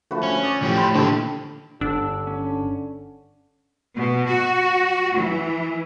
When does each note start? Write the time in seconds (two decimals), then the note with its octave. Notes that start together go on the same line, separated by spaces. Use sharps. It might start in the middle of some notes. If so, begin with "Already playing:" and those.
0.11 D3 F3 A3 F#4 B4
0.23 C#4
0.43 C#5 D5 D#6
0.62 A2 F3 G4
0.77 C5 B5
0.95 A#2 D3 G4
1.81 G1 D3 D4 E6
2.27 C#4
3.96 B2
4.28 F#4
5.15 E3